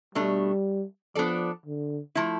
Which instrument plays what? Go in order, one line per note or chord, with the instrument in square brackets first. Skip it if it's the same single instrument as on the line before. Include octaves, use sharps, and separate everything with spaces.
[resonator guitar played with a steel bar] B2 A3 D4 [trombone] G3
[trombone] F3 [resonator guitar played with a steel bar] B3 D4 A4 D5
[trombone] D3
[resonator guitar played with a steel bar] F3 A3 E4